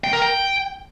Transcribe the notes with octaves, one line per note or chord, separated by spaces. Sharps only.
G5
A#4
G5